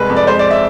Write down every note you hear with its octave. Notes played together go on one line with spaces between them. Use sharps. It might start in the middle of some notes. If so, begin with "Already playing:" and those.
Already playing: C2 G#3 B4
F2
D5
G#3 C5
D5
E5